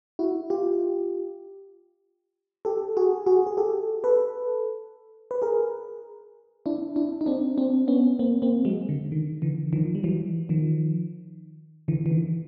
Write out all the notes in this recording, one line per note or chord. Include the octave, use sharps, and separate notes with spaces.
E4 F#4
F4 G4
G4 A4
F#4 G#4
F#4 G#4
G#4
G4 A4
A4 B4
B4
G#4 A#4
D4 E4
D4 E4
D#4
C4 D4
C4 D4
B3 C#4
A#3 C4
A#3 C4
F#3 G#3
D3
D#3
D3 E3
D#3 F3
G3
E3 F#3
D#3 F3
D3 E3
E3
D#3